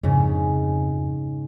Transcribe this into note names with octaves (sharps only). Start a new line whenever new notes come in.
F2 G#2 C#3